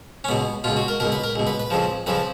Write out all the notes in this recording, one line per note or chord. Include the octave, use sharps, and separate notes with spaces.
C#4
C#2 B2 B3
C#2 B2 F4
F#4
A#4
C#2 B2 A#4
B4
A#4
C#2 B2
B4
B4
F2 C#3 F3
F2 C#3 F3 B4